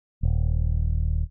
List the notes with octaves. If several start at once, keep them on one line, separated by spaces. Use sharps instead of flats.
D#1